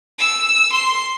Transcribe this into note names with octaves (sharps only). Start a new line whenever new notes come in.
E6
C6